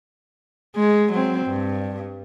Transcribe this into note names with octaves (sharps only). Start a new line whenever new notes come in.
G#3
F#3 C4
G2